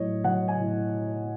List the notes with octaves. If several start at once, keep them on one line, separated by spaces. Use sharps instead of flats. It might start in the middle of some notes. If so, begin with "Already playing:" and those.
Already playing: A2 F#3 C#5 D#5
F#3 F#5
G#5
A2